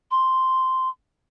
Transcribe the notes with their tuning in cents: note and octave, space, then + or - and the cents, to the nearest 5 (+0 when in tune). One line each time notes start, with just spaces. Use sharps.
C6 -5